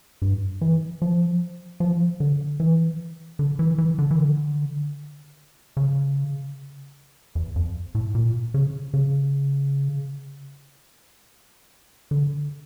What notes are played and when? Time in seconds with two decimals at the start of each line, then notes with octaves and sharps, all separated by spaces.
0.22 G2
0.61 E3
1.02 F3
1.80 F3
2.20 D3
2.60 E3
3.39 D3
3.59 E3
3.78 E3
3.99 D3
4.11 E3
4.18 D3
5.77 C#3
7.35 E2
7.56 F2
7.95 A2
8.15 A#2
8.54 C#3
8.94 C#3
12.11 D3